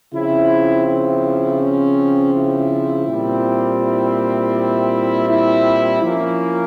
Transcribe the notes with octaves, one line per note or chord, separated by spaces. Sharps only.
C#3 F3 C4 E4
E4
C#4
E4
A#2 G3 C4
E4
E4
F3 A#3 C#4 E4